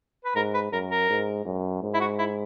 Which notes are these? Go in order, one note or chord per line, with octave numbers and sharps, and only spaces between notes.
B4
G#2 A#4
B4
F#2 A#4
A#4
G#2
F#2
G#2
E4
F#4
E4